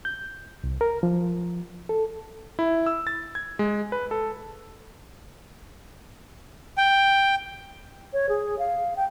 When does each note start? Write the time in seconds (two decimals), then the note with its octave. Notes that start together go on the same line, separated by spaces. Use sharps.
0.05 G6
0.64 C2
0.81 A#4
1.03 F3
1.89 A4
2.59 E4
2.87 E6
3.07 A6
3.35 G#6
3.59 G#3
3.92 B4
4.11 A4
6.78 G5
8.13 C#5
8.29 G#4
8.59 F5
8.97 G5